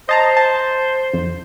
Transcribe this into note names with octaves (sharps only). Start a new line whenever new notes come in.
C5 D#5 A5 A#5
A5
F2